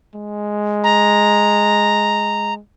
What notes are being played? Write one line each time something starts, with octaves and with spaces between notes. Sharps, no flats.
G#3
A#5